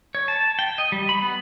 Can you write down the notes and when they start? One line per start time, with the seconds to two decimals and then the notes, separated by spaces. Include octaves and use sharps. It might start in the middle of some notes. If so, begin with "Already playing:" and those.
0.15 C#5
0.28 A5
0.59 G5
0.78 D#5
0.92 G3
1.09 B5
1.22 B3